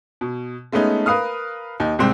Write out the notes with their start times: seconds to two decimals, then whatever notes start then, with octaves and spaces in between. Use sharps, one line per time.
0.21 B2
0.72 G#3 A3 B3 C#4 D#4
1.06 A#4 B4 F5 D#6 F6
1.80 D#2 D#4
1.99 C2 G#2 C4